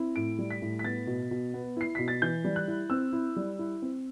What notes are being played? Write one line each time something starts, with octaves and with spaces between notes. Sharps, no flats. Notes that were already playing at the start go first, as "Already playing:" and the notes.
Already playing: C4 E4
A2 D7
G3
B6
A2
B6
B3 A6
B2
B2
B3
E4 C7
B2 B6
A6
E3 G6
G3
F#6
E4
C4 E6
E4
G3
E4
C4